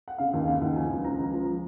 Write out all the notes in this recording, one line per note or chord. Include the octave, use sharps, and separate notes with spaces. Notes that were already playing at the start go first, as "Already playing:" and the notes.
F#5
C#3 F5
D#2
C#3 F5
D#2 F#5
F3 G#5
C#2
F3 A#5
C#2
F3